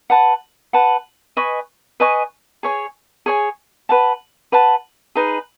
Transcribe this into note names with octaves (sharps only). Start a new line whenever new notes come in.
B4 F#5 A5
B4 F#5 A5
B4 D#5 G#5 C#6
B4 D#5 G#5 C#6
G#4 C#5 G#5
G#4 C#5 G#5
B4 F#5 A5
B4 F#5 A5
D#4 G#4 B4